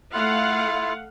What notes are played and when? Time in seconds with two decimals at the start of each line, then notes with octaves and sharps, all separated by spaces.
0.13 A3 E4 F4 F5 F#5